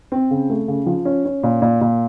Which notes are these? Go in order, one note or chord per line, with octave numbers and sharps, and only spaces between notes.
C4
C#3
A3
C#3
F3
C#4
C#4
A#2
A#2
A#2